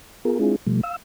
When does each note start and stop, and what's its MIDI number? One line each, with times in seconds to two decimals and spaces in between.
0.25 0.39 59
0.25 0.39 65
0.25 0.39 68
0.25 0.39 70
0.39 0.56 56
0.39 0.56 60
0.39 0.56 62
0.39 0.56 64
0.39 0.56 65
0.39 0.56 68
0.67 0.81 47
0.67 0.81 53
0.67 0.81 55
0.67 0.81 57
0.83 0.96 77
0.83 0.96 88